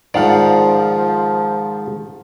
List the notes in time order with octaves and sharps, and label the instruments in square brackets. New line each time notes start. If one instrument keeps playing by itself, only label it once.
[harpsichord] G#2 D#3 [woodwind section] F3 [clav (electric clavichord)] D5 F5 F#5